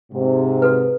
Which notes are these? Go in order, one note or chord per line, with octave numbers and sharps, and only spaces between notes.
G#2 C3
F#4 A4 B4